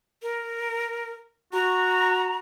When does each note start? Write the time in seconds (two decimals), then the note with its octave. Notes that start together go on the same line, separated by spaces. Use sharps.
0.23 A#4
1.54 F#4 A#5